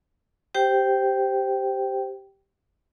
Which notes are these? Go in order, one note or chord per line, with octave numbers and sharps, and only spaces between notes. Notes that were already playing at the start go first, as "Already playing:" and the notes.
G4 C5 G5